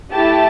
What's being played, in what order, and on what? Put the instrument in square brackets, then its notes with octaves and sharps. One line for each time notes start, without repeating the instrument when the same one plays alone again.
[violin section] A3 E4 G4 A5